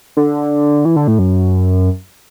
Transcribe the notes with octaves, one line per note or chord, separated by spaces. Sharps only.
D3
E3
D3
A2
F#2